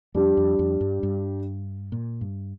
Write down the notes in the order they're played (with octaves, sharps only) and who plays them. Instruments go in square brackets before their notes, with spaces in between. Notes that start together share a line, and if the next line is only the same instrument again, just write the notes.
[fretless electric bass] F2 [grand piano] G3 D4 G4
[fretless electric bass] F2
F2
G2
G2
A#2
G2